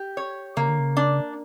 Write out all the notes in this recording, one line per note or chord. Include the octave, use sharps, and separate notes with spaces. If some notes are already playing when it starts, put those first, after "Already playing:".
Already playing: G4
C#5
C#3 A#3
D3
C#3
D4